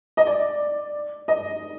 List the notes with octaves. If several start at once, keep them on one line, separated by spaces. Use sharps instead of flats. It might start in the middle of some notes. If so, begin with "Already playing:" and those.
D#5
D5
D#5